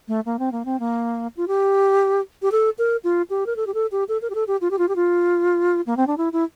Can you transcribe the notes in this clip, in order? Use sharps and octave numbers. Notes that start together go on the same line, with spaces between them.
A3
A#3
C4
A#3
C4
A#3
F4
G4
G4
A4
A#4
F4
G4
A#4
A4
G4
A4
G4
A4
A#4
G4
A4
G4
F4
G4
F4
G4
F4
A#3
C4
D4
E4
E4